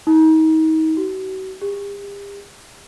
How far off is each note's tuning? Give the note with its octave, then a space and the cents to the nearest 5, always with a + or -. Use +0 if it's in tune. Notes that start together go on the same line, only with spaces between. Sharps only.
D#4 +35
F#4 +40
G4 +40